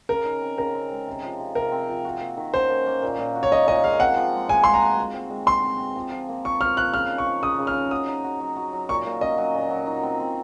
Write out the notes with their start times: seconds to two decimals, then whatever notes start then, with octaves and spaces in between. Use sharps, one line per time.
0.09 C#3 A#4
0.26 D#4
0.42 C4
0.58 C#3 A#4
0.74 C4
0.91 G#3
1.07 C3
1.23 F3
1.40 C3
1.55 C3 A#4
1.72 C4
1.88 F3
2.05 F#4
2.21 A#3
2.37 D#3
2.54 C#4 C5
2.70 A#3
2.86 A#3
3.02 A#2
3.19 A#2
3.35 F#4
3.43 C#5
3.51 D#4 D#5
3.68 A#2 D#5
3.84 G#3 F5
4.00 C4 F#5
4.17 F3
4.33 G#3
4.49 G#3 G#5
4.64 G#3 C6
4.74 A#5
4.82 F#4
4.98 F#4
5.14 C4
5.30 G#3
5.46 C4 C6
5.63 C4
5.79 F#4
5.96 F3
6.12 F3
6.29 A#3
6.45 F3 C#6
6.61 F3 F6
6.77 F3 F#6
6.93 C#3 F6
7.10 D#4
7.18 C#6
7.26 F3
7.42 C#3 D#6
7.59 C#3
7.67 F6
7.75 D#4
7.91 F#4 D#6
8.08 D#4
8.24 F#4
8.40 F#3
8.56 F#4
8.73 F#3
8.89 A#2 C#6
9.06 A#2
9.21 C#4 D#5
9.38 F#3
9.54 A#2
9.71 F#3
9.87 D#4
10.03 C4
10.20 C4